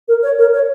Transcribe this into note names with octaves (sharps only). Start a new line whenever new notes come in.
A#4
C#5
A#4
C#5